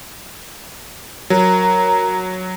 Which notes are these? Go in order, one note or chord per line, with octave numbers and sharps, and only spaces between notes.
F#3 A#4